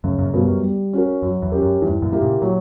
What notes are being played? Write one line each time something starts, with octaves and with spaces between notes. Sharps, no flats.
F#2 C#3
F#2 A#2
G2 B2 G3 B3 F#4 A#4
F#2
G3
C#4 F#4 A#4
F#2 F#3
E2
C#4 G4 A#4
F#2
E2 G2 E3
F#2 A#2
A#3 E4 G4 A#4
A#2 C#3
A#2 F#3